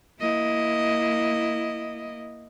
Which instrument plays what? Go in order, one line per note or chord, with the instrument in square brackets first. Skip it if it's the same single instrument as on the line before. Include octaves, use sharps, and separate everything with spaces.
[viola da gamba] A#3 E4 D#5